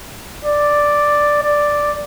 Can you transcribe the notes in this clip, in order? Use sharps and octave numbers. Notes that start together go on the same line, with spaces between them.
D5
D5